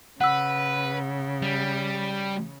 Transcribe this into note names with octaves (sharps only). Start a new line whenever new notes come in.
C#3 B4 F#5 E6
G3